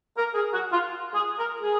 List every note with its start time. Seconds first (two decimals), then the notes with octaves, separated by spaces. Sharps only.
0.18 A#4
0.35 G#4
0.54 F#4
0.72 F4
1.14 G#4
1.38 A#4
1.62 G#4